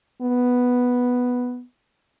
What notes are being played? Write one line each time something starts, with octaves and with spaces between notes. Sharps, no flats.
B3